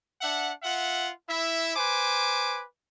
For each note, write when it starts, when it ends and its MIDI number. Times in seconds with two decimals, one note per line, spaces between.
0.22 0.51 62
0.22 0.51 76
0.22 0.51 78
0.62 1.11 65
0.62 1.11 76
0.62 1.11 78
1.28 1.75 64
1.28 1.75 76
1.76 2.63 71
1.76 2.63 72
1.76 2.63 80
1.76 2.63 86